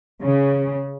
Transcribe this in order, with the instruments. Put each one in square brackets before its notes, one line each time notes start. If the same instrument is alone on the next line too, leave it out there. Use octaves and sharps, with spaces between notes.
[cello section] C#3